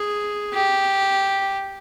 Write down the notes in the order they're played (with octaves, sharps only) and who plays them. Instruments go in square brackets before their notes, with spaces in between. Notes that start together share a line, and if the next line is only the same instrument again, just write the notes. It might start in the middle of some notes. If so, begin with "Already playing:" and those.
Already playing: [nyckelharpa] G#4
G4